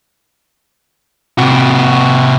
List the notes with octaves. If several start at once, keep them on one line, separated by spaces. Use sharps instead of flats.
C3 F#4